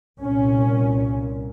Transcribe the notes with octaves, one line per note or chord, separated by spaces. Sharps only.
C2 A#2 C#4